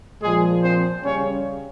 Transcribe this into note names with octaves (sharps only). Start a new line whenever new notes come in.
A#2 F3 G#3 G#4
C4 C5
C#3 G3 C#4 C#5